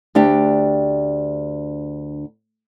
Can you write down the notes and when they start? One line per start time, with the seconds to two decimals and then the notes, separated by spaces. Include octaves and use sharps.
0.15 D2 D4 G4